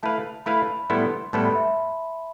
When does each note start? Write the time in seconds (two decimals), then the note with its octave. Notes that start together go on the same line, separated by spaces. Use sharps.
0.03 A3 E4 B4 F5 A5
0.46 A3 E4 B4 F5 B5
0.90 A2 G3 B3 E4 A4 C6
1.33 A2 G3 B3 E4 A4 A5
1.45 B5
1.55 E5